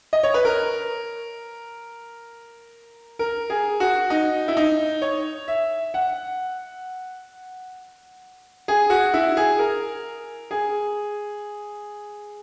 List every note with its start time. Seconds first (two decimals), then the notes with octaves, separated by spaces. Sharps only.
0.13 D#5
0.23 C#5
0.34 B4
0.45 A#4
3.19 A#4
3.50 G#4
3.80 F#4
4.10 D#4
4.48 E4
4.57 D#4
5.02 C#5
5.48 E5
5.94 F#5
8.68 G#4
8.90 F#4
9.14 E4
9.37 G#4
9.59 A#4
10.51 G#4